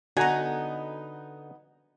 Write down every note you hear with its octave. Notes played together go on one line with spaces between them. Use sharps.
D3 B3 D#4 F#4 F#5 G#5 A#5